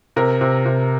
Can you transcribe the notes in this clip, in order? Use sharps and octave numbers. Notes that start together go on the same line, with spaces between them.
C3 A#4
C3
C3